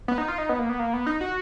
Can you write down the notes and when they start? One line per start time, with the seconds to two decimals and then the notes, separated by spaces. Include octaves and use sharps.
0.08 B3
0.18 D#4
0.28 F4
0.38 D#4
0.49 B3
0.59 A#3
0.69 B3
0.79 A#3
0.93 B3
1.07 D#4
1.21 F#4